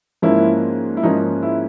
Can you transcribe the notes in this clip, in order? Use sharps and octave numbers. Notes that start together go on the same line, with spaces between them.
G#2 F3 A#3 C#4 E4
E4
G#2 F3 A#3 C#4 D#4
E4